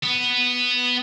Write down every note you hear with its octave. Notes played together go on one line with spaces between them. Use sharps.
B3